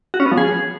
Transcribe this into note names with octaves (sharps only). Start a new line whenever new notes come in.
F#4
C#4
B3
F3
G#4